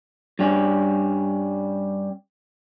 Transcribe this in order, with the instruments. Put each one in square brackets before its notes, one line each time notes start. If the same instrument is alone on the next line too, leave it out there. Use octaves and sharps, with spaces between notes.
[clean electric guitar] G2 G3 C#4